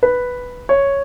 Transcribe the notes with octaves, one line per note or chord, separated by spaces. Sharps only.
B4
C#5